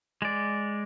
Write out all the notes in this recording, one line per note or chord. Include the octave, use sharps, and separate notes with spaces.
G#3 D5